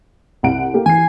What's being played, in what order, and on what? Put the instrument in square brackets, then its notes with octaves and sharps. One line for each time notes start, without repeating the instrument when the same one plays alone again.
[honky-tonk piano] C2 F#5 D7
A#3 G4 A4
[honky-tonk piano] E3 C7 [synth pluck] G#5